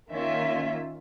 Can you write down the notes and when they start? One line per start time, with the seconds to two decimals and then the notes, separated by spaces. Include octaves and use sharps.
0.11 D#3 A#3 C#4 F4 E5